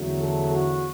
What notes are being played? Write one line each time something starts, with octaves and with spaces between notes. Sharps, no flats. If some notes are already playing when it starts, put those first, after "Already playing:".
Already playing: E2 D3 F#3 A3
A4
F#4